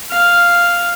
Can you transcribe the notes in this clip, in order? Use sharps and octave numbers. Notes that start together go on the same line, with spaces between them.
F5